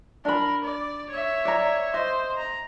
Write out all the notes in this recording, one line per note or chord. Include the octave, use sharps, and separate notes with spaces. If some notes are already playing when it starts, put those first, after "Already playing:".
D4 A#4 B5
D5
C#5 E5
D5 A#5
C5 D#5
A#5